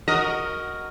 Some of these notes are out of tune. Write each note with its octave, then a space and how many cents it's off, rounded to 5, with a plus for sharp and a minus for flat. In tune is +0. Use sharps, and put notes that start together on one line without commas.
F#4 +0 A#4 +0 D#5 -5